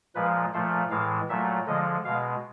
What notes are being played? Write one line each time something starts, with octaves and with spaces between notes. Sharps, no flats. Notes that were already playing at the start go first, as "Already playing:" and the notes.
A#2 F3 G#3 B4
A#2 F3 A3 C5
A2 E3 G#3 F5
A#2 F#3 A3 E5
D3 F3 G#3 D#5
B2 G#3 F5